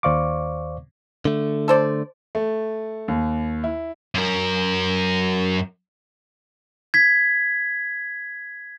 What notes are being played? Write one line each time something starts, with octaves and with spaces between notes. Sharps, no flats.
D#2 C5 D5 F5 C#6 D6
D3 A3
A4 C5 D5
A3
D#2
E4
F#2 A#4
G#6 B6